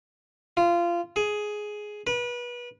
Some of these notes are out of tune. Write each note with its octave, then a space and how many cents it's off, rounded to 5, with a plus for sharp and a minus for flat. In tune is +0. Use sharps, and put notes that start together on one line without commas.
F4 -20
G#4 +10
B4 -30